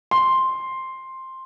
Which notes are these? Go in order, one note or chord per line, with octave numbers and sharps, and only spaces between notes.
C6